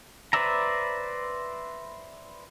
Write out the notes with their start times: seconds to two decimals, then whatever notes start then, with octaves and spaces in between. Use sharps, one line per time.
0.33 B4 C5 D5 E5 A#5